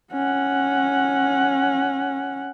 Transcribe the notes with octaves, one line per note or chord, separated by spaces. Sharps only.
C#4 F#5